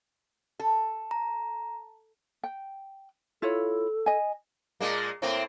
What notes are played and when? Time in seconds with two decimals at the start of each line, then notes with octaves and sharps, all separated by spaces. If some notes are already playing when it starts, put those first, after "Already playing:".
0.59 A4
1.11 A#5
2.43 G5
3.42 E4 F4 A4 C#5
4.06 D#5 G#5
4.81 A#2 G#3 A#3
5.22 A2 A#3 C4